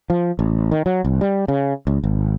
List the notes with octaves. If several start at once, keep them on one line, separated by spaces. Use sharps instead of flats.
F3
A1
D#3
F#3
C2
G3
C#3
C#2
G#1